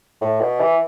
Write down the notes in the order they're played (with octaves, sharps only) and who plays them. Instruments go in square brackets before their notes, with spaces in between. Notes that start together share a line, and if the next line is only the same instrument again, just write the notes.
[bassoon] A2
B2
E3